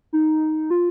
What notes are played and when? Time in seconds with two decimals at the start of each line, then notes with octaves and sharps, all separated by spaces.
0.13 D#4
0.70 F4